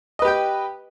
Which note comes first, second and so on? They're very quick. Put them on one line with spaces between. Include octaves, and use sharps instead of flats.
D#5 B4 G4 G5